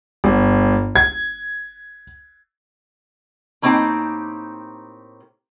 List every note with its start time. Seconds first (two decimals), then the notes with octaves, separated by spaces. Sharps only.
0.24 G1
0.96 G#6
3.62 A2 A#3 C4 D#4 G4